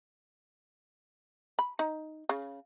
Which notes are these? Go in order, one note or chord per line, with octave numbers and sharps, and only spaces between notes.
B5
D#4
C#3